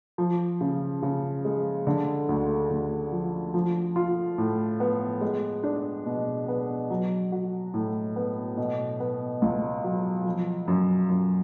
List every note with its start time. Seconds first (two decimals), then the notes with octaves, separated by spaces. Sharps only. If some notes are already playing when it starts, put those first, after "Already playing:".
0.18 F3
0.61 C#3
1.03 C#3
1.45 G#3
1.87 D3
2.29 D2
2.71 D2
3.12 F3
3.54 F3
3.96 F4
4.38 A2
4.80 B3
5.21 G#3
5.63 D4
6.06 B2
6.48 B3
6.90 F#3
7.32 F#4
7.74 A2
8.16 B3
8.57 B2
9.00 B3
9.42 C#2
9.84 F#3
10.25 F3
10.68 F#2
11.10 F#2